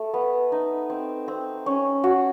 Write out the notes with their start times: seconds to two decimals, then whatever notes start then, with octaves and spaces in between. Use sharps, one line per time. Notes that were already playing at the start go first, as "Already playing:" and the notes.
Already playing: A3
0.14 B3
0.52 D#4
0.90 C4
1.28 C4
1.66 C#4
2.04 F#4